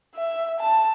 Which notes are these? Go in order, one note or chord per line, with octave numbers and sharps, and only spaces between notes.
E5
A5